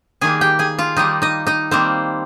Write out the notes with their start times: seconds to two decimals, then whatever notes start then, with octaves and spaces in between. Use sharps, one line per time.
0.21 D#3 G3 A#3 G#4 G#5
0.41 G4 G5
0.59 G#4 G#5
0.78 F4 F5
0.96 D#3 G3 A#3 D#4 D#5
1.22 D#4 D#5
1.47 D#4 D#5
1.71 D#3 G3 A#3 C4 C5